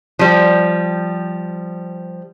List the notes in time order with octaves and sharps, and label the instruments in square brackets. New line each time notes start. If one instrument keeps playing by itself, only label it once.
[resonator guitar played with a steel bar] F3 G3